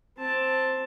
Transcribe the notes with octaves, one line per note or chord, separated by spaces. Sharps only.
C4 A5